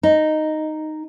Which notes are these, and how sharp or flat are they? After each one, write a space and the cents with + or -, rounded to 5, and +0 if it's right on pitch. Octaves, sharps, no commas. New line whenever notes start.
D#4 -5